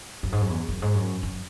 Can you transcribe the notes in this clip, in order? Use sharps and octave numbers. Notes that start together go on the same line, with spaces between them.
F#2
G#2
F#2
E2
F#2
G#2
F#2
F#2